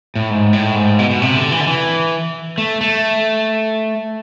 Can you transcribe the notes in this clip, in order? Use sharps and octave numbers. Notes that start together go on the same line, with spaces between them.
A2
G#2
A2
G#2
B2
B2
C3
D3
E3
D3
E3
A3
A3